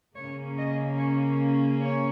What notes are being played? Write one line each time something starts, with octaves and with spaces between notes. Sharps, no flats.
C#3 A#3 C#4 C#5
D#5
C#5
C#5